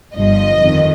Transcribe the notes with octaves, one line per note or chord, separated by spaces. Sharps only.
G1 G2 F3 D#5
F2 D#3